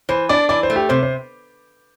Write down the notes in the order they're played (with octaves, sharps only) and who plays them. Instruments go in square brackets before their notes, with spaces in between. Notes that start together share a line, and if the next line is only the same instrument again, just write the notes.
[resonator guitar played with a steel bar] E3 [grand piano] C5
[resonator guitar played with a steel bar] D4 [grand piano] D5
[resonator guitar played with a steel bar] E3 [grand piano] D5
[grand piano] C5
[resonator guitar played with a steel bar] A3
[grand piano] G4
[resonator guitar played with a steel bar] C3 [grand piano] C5
[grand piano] C5